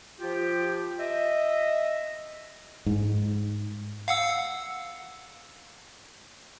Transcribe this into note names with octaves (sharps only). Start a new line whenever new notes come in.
F3 F4 G4
D#5 E5
G#2
F5 F#5 E6